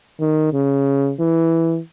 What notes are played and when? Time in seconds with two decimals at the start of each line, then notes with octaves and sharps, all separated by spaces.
0.20 D#3
0.53 C#3
1.19 E3